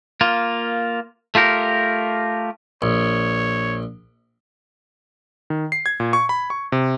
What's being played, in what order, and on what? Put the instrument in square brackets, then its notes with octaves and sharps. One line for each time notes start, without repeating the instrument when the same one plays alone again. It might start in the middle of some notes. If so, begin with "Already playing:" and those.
[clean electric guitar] A#3 F4
A3 F4 G4 A#4
[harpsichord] A#1 [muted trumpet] C#5
[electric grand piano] D#3
C7
G#6
A#2
C#6
B5
C#6
C3